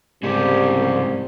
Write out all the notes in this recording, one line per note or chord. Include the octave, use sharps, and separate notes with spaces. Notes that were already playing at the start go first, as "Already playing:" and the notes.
C2 G#2 C#3 G#3 G4